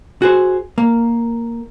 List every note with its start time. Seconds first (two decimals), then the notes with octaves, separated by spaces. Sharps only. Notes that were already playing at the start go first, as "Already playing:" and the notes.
0.22 F#4 G#4 C5
0.78 A#3